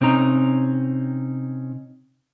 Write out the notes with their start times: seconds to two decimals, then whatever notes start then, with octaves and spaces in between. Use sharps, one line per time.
0.01 C3 C4 C#4 D#4 A#5